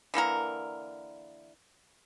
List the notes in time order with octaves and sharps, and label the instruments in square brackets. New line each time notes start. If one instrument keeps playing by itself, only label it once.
[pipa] D3 E3 A#3 A#4